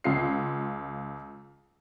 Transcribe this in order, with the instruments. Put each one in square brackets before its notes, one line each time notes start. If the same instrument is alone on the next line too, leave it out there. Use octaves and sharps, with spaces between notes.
[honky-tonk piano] C#2 F4 C7